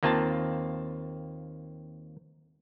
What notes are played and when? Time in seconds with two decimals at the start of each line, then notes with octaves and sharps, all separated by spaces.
0.03 D#2 A#3 C4 F4 A5